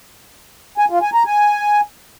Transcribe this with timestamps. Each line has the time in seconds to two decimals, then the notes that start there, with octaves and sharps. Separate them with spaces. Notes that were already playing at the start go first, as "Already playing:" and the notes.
0.78 G#5
0.90 F4
1.02 G#5
1.14 A#5
1.26 G#5